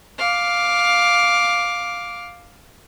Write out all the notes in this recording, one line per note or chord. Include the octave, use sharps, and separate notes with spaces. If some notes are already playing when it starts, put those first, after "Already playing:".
F5 D6